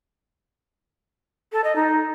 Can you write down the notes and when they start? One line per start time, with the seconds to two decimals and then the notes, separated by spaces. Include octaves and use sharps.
1.52 A4
1.64 D#5
1.76 D#4